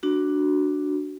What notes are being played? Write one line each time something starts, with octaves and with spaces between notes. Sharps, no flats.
D4 F#4